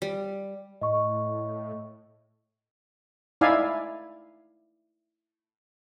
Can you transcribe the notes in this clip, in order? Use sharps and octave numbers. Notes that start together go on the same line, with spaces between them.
G3
A2 D#5 C#6
D#4 E4 D5 E5 F5 G#5